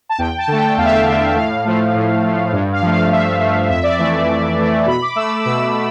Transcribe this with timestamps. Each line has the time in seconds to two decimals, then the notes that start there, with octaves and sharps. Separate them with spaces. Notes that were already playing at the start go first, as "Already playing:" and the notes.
0.09 A5
0.18 E2 G5
0.38 A5
0.48 D3 A3
0.58 G5
0.77 E2 F5
0.85 E5
0.91 F5
1.07 D3 A3
1.36 A2 F5
1.65 F3 A3
1.95 A2
2.23 F3 A3
2.53 G2
2.72 F5
2.82 F3 A3
2.92 F5
3.12 G2 E5
3.41 F3 A3
3.70 F2 E5
3.83 D5
3.98 E3 A3 E5
4.28 F2
4.58 E3 A3
4.86 B2 B5
5.01 D6
5.16 A3 E6
5.39 D6
5.45 B2 E6
5.74 A3